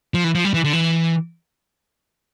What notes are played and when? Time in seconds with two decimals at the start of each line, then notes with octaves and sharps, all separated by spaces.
0.14 F3
0.24 E3
0.35 F3
0.45 G3
0.54 E3
0.64 D3
0.73 E3